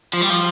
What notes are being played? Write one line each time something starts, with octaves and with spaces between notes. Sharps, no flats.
F3
G3
F3